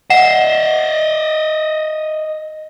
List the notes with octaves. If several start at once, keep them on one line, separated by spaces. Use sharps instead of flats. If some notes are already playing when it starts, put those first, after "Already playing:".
D#5 E5 F#5 C7 E7